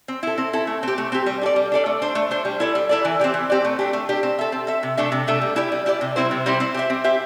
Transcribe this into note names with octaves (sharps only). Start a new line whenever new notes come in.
C4
E4 A4
C4
E4 A4
A3
C4 G4
A3
C4 G4
G3
D4 A4 D5
G3
D4 A4 D5
A3
D4 C5
A3
D4 C5
G3
E4 A4 D5
G3
E4 A4 D5
E3
C4 G4 D5
E3
C4 G4 D5
A3
D4 G4
A3
D4 G4
C4
A4 E5
C4
A4 E5
C3
A3 D4 A4 E5
C3
A3 D4 A4 E5
G3
E4 G4 D5
G3
E4 G4 D5
C3
G3 C4 E4 C5
C3
G3 C4 E4 C5
C4
G4 C5 E5
C4
G4 C5 E5